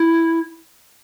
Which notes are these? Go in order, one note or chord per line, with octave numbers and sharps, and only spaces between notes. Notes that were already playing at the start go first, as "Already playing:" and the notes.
Already playing: E4